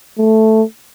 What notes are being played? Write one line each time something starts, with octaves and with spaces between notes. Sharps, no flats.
A3